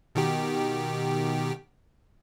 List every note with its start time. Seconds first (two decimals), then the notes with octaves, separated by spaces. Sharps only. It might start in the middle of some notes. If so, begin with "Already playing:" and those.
0.15 B2 D#3 G4